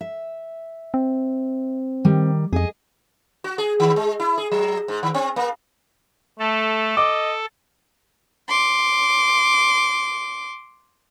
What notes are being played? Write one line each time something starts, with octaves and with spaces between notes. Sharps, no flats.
E5
C4
D#3 G3
F2 G#4 D#5
F#4
G#4
D#3
G#3
E4
G#4
F#3
G#2
D#3
C4
A#3
A3 A4
D#5 D6
C6 D6